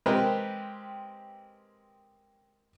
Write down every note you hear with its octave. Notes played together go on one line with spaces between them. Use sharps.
G#3 C4 G4 A#4 B4